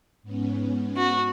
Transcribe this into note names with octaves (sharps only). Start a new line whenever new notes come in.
G#2 B3 C#4
F#4